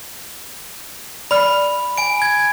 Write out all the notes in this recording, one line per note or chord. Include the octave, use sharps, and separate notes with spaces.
D5 B5 F6
G#5 D7
G#6